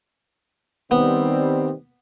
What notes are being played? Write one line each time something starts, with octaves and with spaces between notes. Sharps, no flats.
D#3 G3 B3 C4